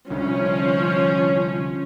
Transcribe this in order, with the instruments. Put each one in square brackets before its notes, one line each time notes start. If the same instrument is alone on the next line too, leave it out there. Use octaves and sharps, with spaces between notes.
[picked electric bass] C2 D3 [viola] F3 [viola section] C#4